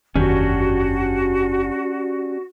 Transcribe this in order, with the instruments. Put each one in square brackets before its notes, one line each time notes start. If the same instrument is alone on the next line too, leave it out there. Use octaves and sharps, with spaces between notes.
[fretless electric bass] F#1 E2 D#3 [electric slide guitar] C#4 D4 G4 [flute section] F#4